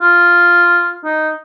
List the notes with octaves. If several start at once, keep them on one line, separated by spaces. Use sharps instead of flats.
F4
D#4